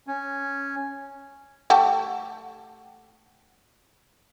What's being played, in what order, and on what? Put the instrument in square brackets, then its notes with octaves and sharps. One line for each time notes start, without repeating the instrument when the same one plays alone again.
[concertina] C#4
[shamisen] A3 G4 A5 [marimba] F#5